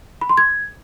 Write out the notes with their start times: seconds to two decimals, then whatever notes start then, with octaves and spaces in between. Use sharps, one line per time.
0.21 B5
0.29 C6
0.37 G#6